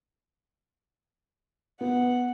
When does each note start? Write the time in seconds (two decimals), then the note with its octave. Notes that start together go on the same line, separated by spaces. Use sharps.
1.81 B3 F#5